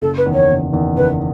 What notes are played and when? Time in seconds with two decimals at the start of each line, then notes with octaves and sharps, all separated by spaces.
0.02 F#1 A4
0.18 B4
0.26 E2 D#3
0.34 C#5
0.49 F#1
0.72 E2 D#3
0.97 F#1 B4